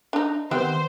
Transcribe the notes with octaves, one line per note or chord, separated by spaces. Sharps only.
D4 D#4
D#3 G3 B3 C4 C5